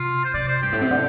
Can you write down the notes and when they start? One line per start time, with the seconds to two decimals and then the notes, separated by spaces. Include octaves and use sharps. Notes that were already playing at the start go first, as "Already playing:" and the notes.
Already playing: C3 F4
0.24 C5
0.34 C3 D5
0.48 C5
0.62 G2 G4
0.73 A2
0.82 C3
0.91 D3